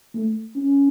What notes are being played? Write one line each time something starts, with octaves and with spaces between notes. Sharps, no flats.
A3
C#4